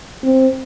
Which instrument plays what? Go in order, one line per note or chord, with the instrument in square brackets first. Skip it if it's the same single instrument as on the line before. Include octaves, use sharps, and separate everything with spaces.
[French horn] C4